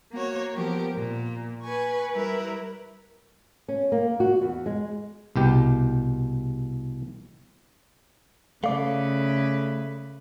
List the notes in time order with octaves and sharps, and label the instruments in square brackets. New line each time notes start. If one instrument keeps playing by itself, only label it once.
[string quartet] A#3 F#4 C#5
F3 B3 G4 A#4
A#2
B4 G#5 C#6
G3 E4 A#4 B4
[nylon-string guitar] C#4
A#3
F#4
E2
G#3
[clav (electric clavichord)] C2 B2 G4
[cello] C#3 B4 [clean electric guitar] A3 D5 [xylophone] F5